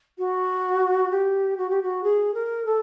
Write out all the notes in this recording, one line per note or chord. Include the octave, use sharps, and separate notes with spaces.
F#4
G4
F#4
G4
F#4
G#4
A#4
A4